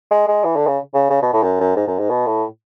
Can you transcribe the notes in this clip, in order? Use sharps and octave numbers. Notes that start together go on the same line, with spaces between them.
G#3
G#3
E3
D3
C#3
C#3
C#3
B2
A2
F#2
F#2
G#2
F#2
G#2
B2
A2